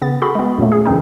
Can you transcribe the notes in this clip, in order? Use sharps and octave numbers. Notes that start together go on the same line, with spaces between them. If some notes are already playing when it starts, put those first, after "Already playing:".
C#3 B3 A6
F#4 G#4 A4 B5
G#3 B3
F#2 A#2 F#3 A3
G#4
F#2 C#3 E3 C4 D#4